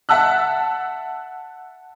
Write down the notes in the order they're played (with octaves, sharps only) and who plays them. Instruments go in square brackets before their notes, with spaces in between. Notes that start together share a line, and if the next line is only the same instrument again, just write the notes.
[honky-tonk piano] E5 F#5 A5 E6 F#6